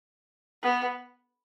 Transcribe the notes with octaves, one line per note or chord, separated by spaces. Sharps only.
B3